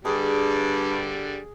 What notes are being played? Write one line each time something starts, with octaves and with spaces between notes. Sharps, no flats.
G2 D3 G3 G#4